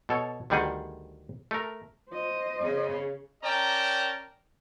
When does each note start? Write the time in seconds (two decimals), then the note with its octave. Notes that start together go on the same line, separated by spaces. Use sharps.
0.09 B2 A4 C#5
0.50 D2 D#3 G3 G#4 F#5
1.51 A3 A#4
2.10 C5 D#5
2.61 C#3
3.44 C#4 A#4 D5 G5 A5 A#5